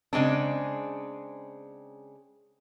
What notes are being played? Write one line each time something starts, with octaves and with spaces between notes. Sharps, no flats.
C#3 G#3 C4 D4